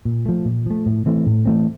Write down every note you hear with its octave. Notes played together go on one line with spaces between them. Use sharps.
A#2
F3 A3
A#2
F3 A3
A2
E3 A3 C4
A2
E3 A3 C4